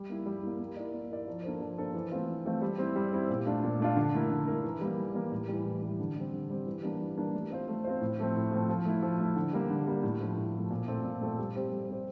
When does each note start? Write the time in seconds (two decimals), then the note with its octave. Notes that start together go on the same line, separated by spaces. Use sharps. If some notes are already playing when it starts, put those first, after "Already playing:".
Already playing: G3
0.10 A#3 E4
0.26 G3
0.43 A#3 E4
0.60 A#3
0.76 E4 A#4 D5
0.94 A#3
1.10 E4 A#4 D5
1.27 F3
1.44 A#3 D4 A4 C5
1.61 F3
1.78 A#3 D4 A4 C5
1.95 E3
2.12 A3 C4 F4
2.28 E3
2.46 A3 C4 F4
2.61 G3
2.78 C4 E4
2.96 G3
3.13 C4 E4
3.29 A#2
3.46 A3 D4 F4
3.64 A#2
3.79 A3 D4 F4
3.97 D3
4.14 A3 E4 A#4
4.31 D3
4.47 A3 E4 A#4
4.64 E3
4.81 G3 A#3
4.98 E3
5.14 G3 A#3
5.31 A2
5.48 E3 G3
5.65 A2
5.82 E3 G3
6.00 D3
6.16 G3 C4
6.33 D3
6.50 G3 C4
6.66 E3
6.83 G3 A#3 D4
7.01 E3
7.17 G3 A#3 D4
7.34 A3
7.51 C4 F4 C5
7.68 A3
7.84 C4 F4 C5
8.01 A2
8.19 F3 A3 C4
8.35 A2
8.52 F3 A3 C4
8.69 F3
8.85 A3 E4
9.03 F3
9.19 A3 E4
9.36 D3
9.53 G3 A#3
9.70 D3
9.87 G3 A#3
10.03 A2
10.21 F3 A3
10.37 A2
10.54 F3 A3
10.70 A#2
10.88 A3 C4 F4 A4
11.04 A#2
11.21 A3 C4 F4 A4
11.39 G3
11.55 C4 G4 C5
11.72 G3
11.89 C4 G4 C5